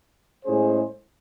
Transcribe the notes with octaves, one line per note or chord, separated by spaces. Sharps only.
A2 G#3 C#4 G#4 C5